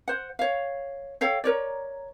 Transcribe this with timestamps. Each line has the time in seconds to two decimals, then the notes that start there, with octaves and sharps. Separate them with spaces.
0.08 C5 F#5
0.39 C#5 F5
1.21 A4 C#5 F5 G5
1.44 A#4 C#5 D5